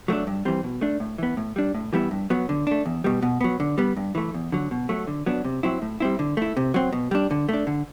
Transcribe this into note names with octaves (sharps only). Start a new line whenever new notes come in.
F#3 A3 D4
G2
E3 G3 C4
B2
A3 D4
A2
E3 B3
A2
G3 D4
A2
E3 G3 B3 E4
G2
F#3 B3
D3
A3 D4
E2
B2 G3
B2
F#3 B3
D3
G3 B3
G2
E3 A3
E2
D3 F#3
B2
F#3 A3
D3
F#3 B3 D4
C3
F#3 C4 E4
A2
G3 C4 E4
D3
A3 E4
C3
F#3 C4
B2
G3 D4
D3
A3 D4
D3